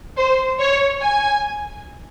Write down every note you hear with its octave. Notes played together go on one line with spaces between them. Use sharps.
C5
C#5
G#5